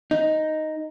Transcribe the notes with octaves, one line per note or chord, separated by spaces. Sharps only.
D#4